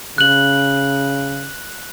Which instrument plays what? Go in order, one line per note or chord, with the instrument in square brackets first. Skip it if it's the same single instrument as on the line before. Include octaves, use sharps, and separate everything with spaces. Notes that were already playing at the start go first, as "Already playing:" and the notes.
[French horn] C#3 [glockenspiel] F#6 F#7